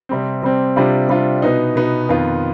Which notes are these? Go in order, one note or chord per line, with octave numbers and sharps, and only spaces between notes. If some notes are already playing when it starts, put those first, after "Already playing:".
C3 G3 C4
C3 G3 C4
C3 G3 D4 F4
C3 G3 D4 F4
B2 B3 D#4
B2 B3 D#4
F2 D#3 B3 F4